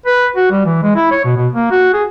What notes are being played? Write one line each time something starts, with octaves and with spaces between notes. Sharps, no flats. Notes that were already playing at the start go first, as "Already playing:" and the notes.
B4
F#4
G3
E3
G#3
E4
C#5
B2
B2
A#3
F#4
G#4